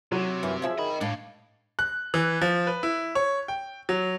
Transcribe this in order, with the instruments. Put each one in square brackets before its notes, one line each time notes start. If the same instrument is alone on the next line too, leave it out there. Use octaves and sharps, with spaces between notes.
[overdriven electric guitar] C3 [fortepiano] F#3
[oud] F#2 [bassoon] E3
[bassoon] F3 [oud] G#4 E5
[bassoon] D#3 [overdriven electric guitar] D#5 B5
[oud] A2 [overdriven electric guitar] D4 F5
[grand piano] F#6
E3
F3
B4
E4
C#5
G5
F#3